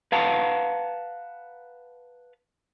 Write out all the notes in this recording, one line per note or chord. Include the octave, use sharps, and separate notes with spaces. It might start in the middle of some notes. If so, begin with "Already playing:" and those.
B4 F5 F#5 A5 A#5